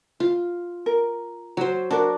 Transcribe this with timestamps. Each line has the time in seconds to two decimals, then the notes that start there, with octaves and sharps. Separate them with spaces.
0.20 F4
0.86 A#4
1.57 F#3 C5
1.91 D4 F#4 A#4